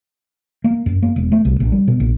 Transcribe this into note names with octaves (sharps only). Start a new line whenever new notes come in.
A#3
F#2
A#3
E1
A3
C2
A#1
G3
B2
A#1